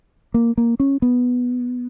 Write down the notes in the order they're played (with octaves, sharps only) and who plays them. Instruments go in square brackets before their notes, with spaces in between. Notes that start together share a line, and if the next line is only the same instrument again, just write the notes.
[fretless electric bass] A#3
A#3
C#4
B3